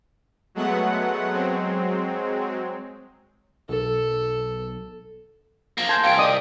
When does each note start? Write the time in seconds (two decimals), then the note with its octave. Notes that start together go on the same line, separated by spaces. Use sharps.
0.55 F#3 G#3 A3 B3 F#5
1.33 F#3 G#3 C4
3.69 B1 A4
5.78 F3 A#3
5.89 G#5 A5 C6 G6 G#6
6.04 C2 F5 G5 D7
6.18 D5 D#5 D#6